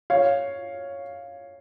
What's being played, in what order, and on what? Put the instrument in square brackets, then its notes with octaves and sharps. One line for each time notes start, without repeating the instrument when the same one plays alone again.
[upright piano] C#5 F5